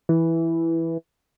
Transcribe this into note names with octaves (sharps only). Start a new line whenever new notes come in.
E3